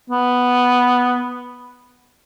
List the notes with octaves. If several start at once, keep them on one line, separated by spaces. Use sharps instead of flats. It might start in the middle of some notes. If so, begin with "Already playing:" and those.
B3